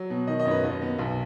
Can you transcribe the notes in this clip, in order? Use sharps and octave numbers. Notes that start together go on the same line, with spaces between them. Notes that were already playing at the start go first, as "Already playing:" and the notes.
Already playing: F#3
B2
D#3 D#5
D#5
F#2 C#5
B4
D#2 D#5
B3
B1